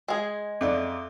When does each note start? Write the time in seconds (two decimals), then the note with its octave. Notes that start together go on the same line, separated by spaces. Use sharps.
0.08 G#3 G#4
0.61 F2 D5 E5 D6